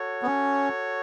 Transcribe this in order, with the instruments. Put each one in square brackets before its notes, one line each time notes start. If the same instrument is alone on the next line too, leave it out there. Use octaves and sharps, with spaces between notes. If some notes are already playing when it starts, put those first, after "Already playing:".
Already playing: [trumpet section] F#4 A4 C#5
[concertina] B3
C#4